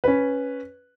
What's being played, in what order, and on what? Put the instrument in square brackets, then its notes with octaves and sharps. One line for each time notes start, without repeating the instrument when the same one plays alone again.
[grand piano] C#4 B4